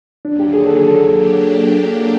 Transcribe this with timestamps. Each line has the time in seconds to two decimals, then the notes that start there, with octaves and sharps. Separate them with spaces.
0.25 D#2 D3 F#3 D4
0.40 G4
0.53 G#4
0.67 A4
0.77 G#4
0.87 A4
1.08 F#3 A#3 D4 G4